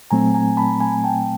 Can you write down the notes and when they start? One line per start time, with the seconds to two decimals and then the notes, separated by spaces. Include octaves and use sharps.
0.11 A#2 F#3 A3 C4 G#5 A#5
0.34 G#5 A#5
0.57 A5 B5
0.80 G#5 A#5
1.04 G5 A5